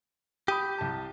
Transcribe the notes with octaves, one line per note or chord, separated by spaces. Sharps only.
G4 B5 D#6 D#7
C2 A5